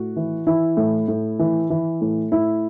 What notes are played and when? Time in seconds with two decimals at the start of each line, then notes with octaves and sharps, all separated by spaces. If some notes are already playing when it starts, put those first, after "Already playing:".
Already playing: A2 F#4
0.16 E3
0.47 E3 E4
0.77 A2
1.08 A2
1.39 E3
1.70 E3
2.01 A2
2.32 A2 E4